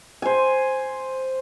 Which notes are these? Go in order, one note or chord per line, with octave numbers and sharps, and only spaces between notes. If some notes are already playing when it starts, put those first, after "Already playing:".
C5 G#5